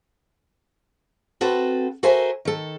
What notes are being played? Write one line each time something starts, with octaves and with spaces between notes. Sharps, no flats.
C4 F#4 A4 B4
F#4 A4 A#4 C5 E5 G#5
D#3 A4